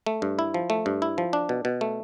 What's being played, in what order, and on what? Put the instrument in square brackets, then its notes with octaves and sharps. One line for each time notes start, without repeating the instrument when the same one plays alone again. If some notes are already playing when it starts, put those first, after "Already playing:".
[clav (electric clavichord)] A3
G2
E4
F3
A3
G2
E4
F3
D4
B2
B2
A3